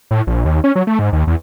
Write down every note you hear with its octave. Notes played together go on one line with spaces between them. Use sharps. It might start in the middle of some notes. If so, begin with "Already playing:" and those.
A2
A#1
D#2
C#4
F#3
A3
G#2
D#2
E2